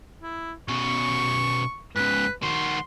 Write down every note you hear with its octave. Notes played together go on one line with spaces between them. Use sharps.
E4
B2 C#4 C#6
G#2 C#3 B4
D#3 F#4 C6